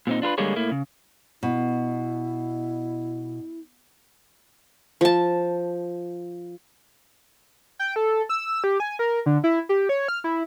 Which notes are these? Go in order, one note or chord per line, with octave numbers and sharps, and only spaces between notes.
A#2 C4 D#4
D4 F4 A#4 B4
D3 G3 G#3 A#3 G#4 C#5
A2 A#3 E4
C#3
B2 E4
F3 A5
G5
A4
E6
G4
G#5
A#4
D3
E4
G4
C#5
F6
E4